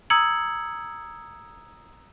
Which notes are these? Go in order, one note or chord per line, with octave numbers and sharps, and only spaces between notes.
A#5 D#6 E6 G#6 C#7 F#7